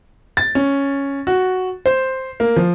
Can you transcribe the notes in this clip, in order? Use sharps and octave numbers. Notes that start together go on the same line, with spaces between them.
A6
C#4
F#4
C5
A#3
F3